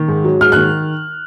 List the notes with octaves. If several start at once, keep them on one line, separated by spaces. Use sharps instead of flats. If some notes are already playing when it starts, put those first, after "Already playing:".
Already playing: D#3
G#2
F#3
G#2 F6
F#6
D#3